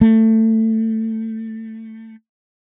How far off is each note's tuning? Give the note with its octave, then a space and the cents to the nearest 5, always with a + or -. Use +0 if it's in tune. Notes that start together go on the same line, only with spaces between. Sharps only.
A3 +20